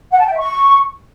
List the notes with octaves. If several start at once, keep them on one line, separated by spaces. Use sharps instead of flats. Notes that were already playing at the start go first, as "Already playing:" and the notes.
F#5
A5
G5
E5
C#6